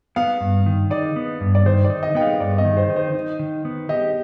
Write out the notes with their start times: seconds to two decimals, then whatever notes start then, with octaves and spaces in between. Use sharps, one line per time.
0.16 B3 F5
0.41 G2
0.66 D#3
0.90 D#4 D5
1.16 B3
1.41 G2
1.55 D5
1.66 D#3 C5
1.84 D5
1.90 D#4
2.03 D#5
2.15 B3 G5
2.21 F5
2.40 G2 D5
2.58 D#5
2.65 D#3
2.77 C5
2.90 D#4
2.96 C5
3.15 D#4
3.39 D#3
3.65 B3
3.89 G4 D#5